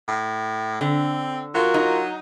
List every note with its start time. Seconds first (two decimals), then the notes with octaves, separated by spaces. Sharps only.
0.08 A2
0.81 D3 C4
1.55 F#3 F4 F#4 A#4
1.74 D#4